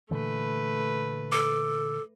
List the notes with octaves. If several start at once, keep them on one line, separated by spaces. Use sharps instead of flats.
A#2 D3 E3 A3 B4
A4 D6